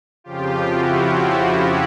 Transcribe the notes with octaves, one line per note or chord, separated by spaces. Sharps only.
F2 C#3 F3 F4 G4
E4 F#4
E4 F#4